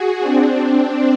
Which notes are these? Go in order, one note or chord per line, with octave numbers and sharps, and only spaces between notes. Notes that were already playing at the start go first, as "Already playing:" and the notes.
Already playing: F#4 G#4
C4 D4